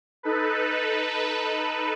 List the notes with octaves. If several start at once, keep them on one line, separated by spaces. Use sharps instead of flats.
D#4 A4 B4